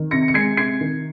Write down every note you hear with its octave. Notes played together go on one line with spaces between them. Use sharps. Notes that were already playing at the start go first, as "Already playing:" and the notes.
Already playing: D#3
C3 A#6 C#7
C#7
G#3 G#6 C7
C3 G#6 C7
D#3